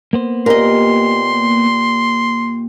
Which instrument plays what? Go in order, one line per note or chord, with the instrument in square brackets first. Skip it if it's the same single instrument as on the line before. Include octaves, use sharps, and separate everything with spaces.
[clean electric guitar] A#3 B3 C5
[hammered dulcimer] A#2 G4 [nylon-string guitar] A#4 D#5 [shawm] C6